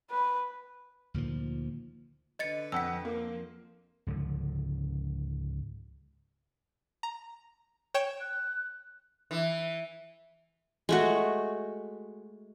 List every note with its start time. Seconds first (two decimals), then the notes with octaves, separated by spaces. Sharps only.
0.10 B4
1.14 D2 A#2 D#3 F3
2.39 D3 B4 D#5 A6 C#7
2.72 F2 F#5 E6 B6
3.05 F2 F3 A#3
4.07 C#2 G#2 D3 F3
7.03 A#5
7.94 C#5 G5 E7
8.21 F#6
9.31 E3
10.89 G#3 A3 F#4